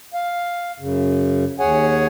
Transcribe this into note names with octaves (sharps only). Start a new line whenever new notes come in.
F5
F#2 C#3
D#2 G#4 C#5 F#5 G#5